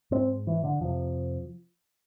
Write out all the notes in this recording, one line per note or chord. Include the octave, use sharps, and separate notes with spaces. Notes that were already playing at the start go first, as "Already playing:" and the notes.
G#2 C4
E3
D3
F2 C3 F3